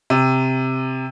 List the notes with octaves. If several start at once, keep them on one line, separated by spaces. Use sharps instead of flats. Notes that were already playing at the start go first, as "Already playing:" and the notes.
C3